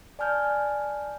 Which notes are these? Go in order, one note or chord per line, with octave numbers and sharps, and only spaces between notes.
D5 G#5 A5 F6 G6